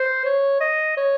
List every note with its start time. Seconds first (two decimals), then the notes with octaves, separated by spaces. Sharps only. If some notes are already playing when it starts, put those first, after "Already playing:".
Already playing: C5
0.25 C#5
0.61 D#5
0.97 C#5